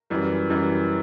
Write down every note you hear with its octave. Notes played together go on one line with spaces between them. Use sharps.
F#2 E3 G3
F#2 E3 G3